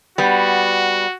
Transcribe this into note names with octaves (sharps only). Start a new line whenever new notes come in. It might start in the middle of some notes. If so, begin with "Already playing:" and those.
G3 B3 F#4